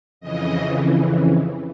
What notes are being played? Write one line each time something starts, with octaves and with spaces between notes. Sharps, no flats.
F2 C#3 E3 D#5